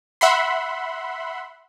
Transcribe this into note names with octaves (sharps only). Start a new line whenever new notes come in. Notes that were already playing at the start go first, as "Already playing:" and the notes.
E5 F#5 B5 C6